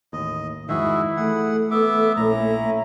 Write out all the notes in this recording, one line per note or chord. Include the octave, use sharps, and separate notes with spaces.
A1 D#2 D#5
F2 G#2 D#3 E4 F#4 G#4 E5
E3 A3 G#4 F#5
B3 E5 D6
A#1 A#2 C#4 E4 A#5